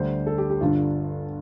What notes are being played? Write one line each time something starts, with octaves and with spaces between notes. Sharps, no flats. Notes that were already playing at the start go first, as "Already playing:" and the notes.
Already playing: D2 D3 G3 C5
A4
G4
G4
G1 G2 D3 F4